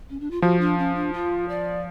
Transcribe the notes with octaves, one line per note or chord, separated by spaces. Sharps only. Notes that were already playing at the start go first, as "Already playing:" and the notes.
C#4
D4
F4
F3 F#4
D4
C#4
D4
F4
D5